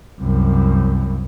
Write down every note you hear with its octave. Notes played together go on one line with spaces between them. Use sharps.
C2 F#2